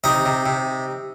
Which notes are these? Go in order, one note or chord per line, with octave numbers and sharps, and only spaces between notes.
C3 D#4 D#5
C3
C3